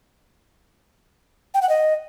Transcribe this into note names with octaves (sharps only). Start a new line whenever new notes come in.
G5
F#5
D#5